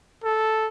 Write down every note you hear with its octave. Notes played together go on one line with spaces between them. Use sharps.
A4